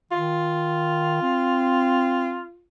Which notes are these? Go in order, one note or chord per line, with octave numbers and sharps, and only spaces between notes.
D#3 F4
C4